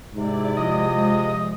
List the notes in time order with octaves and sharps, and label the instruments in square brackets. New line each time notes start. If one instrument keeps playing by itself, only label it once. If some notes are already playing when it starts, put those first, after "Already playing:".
[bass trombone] G#2 [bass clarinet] C3 [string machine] E4 D5
[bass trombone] F3 [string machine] G#3 [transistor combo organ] D#5